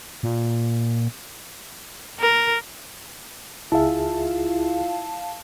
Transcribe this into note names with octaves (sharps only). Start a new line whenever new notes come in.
A#2
A#4
C#2 E4 F4 G#4 E5 F5 A5